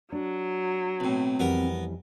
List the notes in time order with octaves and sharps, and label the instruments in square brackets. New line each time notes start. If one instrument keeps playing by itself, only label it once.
[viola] F#3 [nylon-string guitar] D4
[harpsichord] B1 A2 [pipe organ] C4
[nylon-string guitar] F2 E3 G3 [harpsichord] B3 A#4